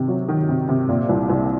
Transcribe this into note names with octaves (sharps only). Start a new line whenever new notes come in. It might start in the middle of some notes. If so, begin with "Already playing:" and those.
Already playing: C3 D#3
F#3
D#3
C3
C3
A#2
C2
C2